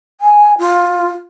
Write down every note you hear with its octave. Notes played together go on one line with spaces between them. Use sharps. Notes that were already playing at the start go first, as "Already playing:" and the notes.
G#5
F4